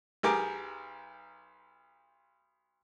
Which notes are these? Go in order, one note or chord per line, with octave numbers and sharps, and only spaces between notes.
B1 G4 G#4 A#4 D6